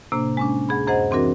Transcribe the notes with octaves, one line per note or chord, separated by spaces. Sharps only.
A2 C3 A#3 D4
G#3 C#4 D4
D2 G#4 B5
F#2 G#4 C5 D#5 F#5
E3 C4 D4 F#4 A#4